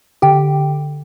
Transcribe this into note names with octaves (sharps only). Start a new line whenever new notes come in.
D3 G4 G5